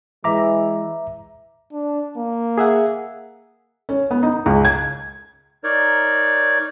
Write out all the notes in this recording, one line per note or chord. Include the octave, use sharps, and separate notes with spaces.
E3 G#3 E5 A#5 D6
D4
A#3
G#4 E5 F#5
C#4
B3
D#4
C#2
G#6
D#4 A#4 C#5 D5